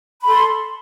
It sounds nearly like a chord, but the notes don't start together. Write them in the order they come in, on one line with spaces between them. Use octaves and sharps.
B5 A4 C6